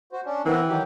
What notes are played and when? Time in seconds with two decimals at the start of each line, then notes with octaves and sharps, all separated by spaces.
0.12 F#4 C5
0.26 C#4 D4
0.46 E3 B3 C4 A#4
0.68 D#3 F#3 G4